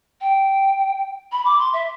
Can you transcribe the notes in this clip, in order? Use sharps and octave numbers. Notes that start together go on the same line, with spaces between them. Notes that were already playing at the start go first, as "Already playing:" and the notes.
G5
B5
D6
C6
E5